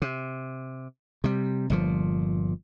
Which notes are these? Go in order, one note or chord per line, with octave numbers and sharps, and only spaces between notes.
C3
C3 G3
G1 A#2 F3